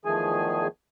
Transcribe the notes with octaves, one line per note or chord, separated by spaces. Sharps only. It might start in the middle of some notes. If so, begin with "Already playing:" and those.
E2 D#3 F3 A3 G#4 G#5